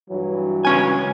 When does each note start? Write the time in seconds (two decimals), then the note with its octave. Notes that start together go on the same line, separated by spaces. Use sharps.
0.10 G2 E3 F#3
0.65 C#2 C#4 G#5